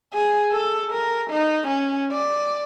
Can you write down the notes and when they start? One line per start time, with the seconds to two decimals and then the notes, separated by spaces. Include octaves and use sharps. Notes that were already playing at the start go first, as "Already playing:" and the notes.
0.14 G#4
0.52 A4
0.92 A#4
1.30 D#4
1.68 C#4
2.12 D5